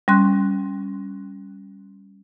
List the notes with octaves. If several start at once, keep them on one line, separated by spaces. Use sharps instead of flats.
G3 C#4 C6 F#6